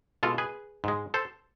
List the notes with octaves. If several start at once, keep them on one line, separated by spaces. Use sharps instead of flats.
B2 G#3 F4 A4
G#4 B4
G#2 G#3
A4 C5